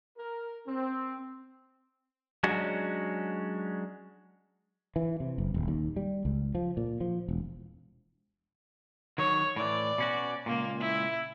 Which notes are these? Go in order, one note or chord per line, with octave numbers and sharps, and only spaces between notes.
A#4
C4
F#3 G#3 C#4 D4 F#4
E3
C3
F#1
D#1
D#2
G3
C#2
F3
A#2
F3
E1
D#3 F#3 C#5
A2 E3 D5
B2 C#4 F#4
C#2 A#2 A#3
E4